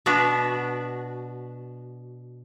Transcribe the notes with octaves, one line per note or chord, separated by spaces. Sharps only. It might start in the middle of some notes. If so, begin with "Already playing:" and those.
B2 B3 D4 F#4